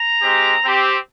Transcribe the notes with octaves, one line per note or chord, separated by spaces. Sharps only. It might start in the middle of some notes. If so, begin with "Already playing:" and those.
Already playing: A#5
G#3 C4 G4
C4 G4